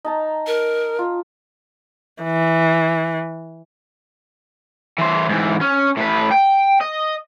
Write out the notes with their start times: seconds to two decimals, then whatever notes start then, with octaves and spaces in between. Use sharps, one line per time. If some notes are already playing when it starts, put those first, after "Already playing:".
0.05 D#4 A5 A#5
0.47 A#4
0.99 F4
2.24 E3
4.98 E3 C5
5.29 G#2 E3
5.61 C#4
5.97 A2 B4
6.32 G5
6.81 D#5